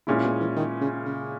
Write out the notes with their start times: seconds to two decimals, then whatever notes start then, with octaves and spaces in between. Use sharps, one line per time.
0.07 A#2 C#3 G#3 C#4 E4
0.24 B2
0.41 E3
0.56 D#3
0.81 C#3
1.06 C#3